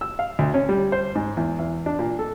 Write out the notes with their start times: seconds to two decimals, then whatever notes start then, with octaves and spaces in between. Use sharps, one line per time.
0.01 E6
0.19 F5
0.39 D2
0.54 C#4
0.69 G3
0.92 C5
1.15 G#2
1.37 E2
1.59 E2
1.86 D4
1.99 A#2
2.19 A4